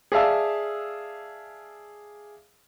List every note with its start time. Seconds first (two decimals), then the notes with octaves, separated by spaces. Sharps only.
0.12 G#4 D5 E5 F5 A5 E6